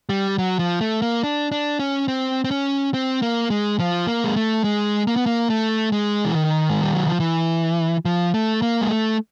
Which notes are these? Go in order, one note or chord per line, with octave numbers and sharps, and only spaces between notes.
G3
F#3
F3
A3
A#3
D4
D4
C#4
C4
C4
C#4
C4
A#3
G#3
F3
A#3
G#3
A3
G#3
A#3
B3
A#3
A3
G#3
E3
D#3
G#3
G3
F#3
F3
E3
F3
A3
A#3
G#3
A3